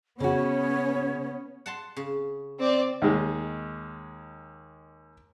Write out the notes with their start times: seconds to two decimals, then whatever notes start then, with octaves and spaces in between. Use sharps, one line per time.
0.20 C#3 B3 C#4 F#4 C#5
1.66 F#5 A5 C6
1.96 C#3
2.59 C4 D5
3.02 D#2 G#3